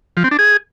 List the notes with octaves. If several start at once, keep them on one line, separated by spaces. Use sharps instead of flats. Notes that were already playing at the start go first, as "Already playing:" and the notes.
F3
C4
D4
G#4